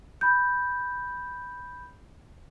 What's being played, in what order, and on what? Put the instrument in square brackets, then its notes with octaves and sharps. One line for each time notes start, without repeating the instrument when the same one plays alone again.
[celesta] B5 G6